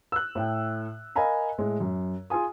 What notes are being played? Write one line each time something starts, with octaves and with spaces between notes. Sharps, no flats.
E6 F#6
A2 G5
A#4 D#5 F5 G#5 A#5 B5
A2 G#3
F#2
F4 G#4 G#5 D#6